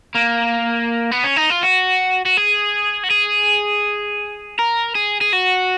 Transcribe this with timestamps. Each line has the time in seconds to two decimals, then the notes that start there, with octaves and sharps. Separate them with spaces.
0.15 A#3
1.12 B3
1.24 C#4
1.37 D#4
1.50 F4
1.63 F#4
2.25 F#4
2.37 G#4
3.04 F#4
3.11 G#4
4.59 A#4
4.95 G#4
5.21 G#4
5.33 F#4